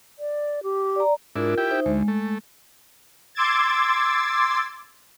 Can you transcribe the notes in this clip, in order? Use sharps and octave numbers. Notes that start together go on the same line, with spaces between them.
D5
G4
D5 A#5
G#2 D4 E4 F4 A#4
E4 G4 G5
D#4 C5 E5
D2 G#3
A3
C6 D6 E6 G#6 A6